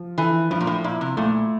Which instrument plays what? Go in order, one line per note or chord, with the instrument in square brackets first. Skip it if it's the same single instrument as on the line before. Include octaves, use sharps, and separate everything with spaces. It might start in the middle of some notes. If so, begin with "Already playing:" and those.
Already playing: [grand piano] F3
[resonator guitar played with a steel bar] E3 [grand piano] A4
[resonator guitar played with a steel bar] G2 [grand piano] F3
[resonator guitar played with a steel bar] A#2
A2
[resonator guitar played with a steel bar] A#2 [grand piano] E4
[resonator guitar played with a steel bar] C3
[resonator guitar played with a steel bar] A#2 [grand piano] A3